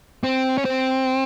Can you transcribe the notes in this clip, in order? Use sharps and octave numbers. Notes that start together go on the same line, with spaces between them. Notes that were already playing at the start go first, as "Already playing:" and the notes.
C4
C#4
C4